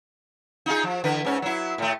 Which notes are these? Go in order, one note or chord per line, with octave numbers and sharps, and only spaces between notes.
D#4 F4 G#4
F3
D3 E3 B4
G#2 C#4
F#3 E4
A2 A3